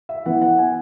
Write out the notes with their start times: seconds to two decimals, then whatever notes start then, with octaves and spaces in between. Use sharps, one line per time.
0.09 E5
0.26 E3 B3 F#5
0.42 F#5
0.58 G#5